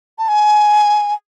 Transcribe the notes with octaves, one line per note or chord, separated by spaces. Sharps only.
A5
G#5